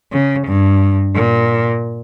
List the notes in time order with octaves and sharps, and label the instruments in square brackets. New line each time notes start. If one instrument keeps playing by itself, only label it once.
[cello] C#3
G2
A#2